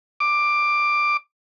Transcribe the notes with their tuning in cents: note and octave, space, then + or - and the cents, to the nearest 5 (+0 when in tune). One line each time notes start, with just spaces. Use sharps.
D6 +10